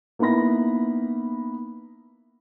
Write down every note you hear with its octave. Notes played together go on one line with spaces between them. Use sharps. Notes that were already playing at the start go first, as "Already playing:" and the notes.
A#3 B3 D#4 E4 B5 A#6